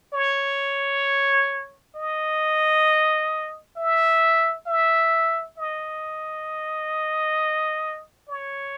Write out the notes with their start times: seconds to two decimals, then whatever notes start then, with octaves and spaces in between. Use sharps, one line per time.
0.13 C#5
1.95 D#5
3.77 E5
4.66 E5
5.57 D#5
8.29 C#5